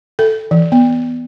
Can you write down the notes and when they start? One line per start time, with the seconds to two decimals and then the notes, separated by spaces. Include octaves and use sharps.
0.19 A4
0.51 E3
0.72 B3